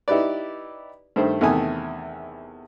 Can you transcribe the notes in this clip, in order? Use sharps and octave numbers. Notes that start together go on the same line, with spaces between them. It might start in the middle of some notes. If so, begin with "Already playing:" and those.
D#4 E4 G4 B4 D5
G2 D#3 A3 C5
E2 C3 D#3 A3 G#5 D#6